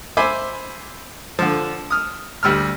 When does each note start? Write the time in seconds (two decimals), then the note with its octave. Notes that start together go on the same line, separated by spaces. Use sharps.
0.17 C5 E5 G#5 B5 D6
1.39 D3 F3
1.91 D#6 F6
2.43 D2 G3 E6 F6